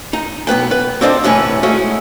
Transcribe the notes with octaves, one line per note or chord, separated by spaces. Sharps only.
D#4
B1 B3 B4 G5
B4
C4 D4 A4 C5 D5 D#5
C2 A2 E3 C#4 B4
G#3 A3 C#4 E4 F#4